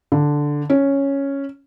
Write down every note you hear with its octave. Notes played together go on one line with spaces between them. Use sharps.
D3
C#4